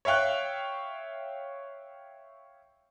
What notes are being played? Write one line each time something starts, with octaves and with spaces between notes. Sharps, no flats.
C#5 E5 F5 G5 F#6